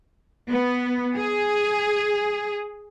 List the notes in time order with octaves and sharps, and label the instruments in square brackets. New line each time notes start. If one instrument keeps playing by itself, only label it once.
[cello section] B3
G#4